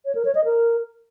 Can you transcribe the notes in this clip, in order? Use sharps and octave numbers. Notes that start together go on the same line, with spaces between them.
C#5
A#4
C#5
D#5
A#4